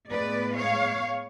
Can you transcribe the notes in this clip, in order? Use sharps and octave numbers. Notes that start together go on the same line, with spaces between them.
A2 G#3 B3 B4 D5
C#5 F5